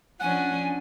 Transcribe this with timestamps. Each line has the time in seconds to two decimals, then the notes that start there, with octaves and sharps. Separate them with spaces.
0.20 F3 C#4 D4 F#5 G#5